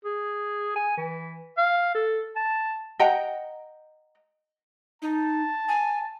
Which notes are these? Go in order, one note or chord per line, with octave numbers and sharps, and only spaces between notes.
G#4
G#5
E3
F5
A4
A5
D#5 F#5 G5 A#5
D#4 A5
G#5